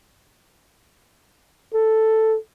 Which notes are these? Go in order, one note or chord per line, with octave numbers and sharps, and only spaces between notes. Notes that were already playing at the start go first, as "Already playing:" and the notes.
A4